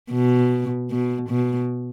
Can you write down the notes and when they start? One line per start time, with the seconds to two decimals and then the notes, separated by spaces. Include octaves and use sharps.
0.11 B2
0.90 B2
1.29 B2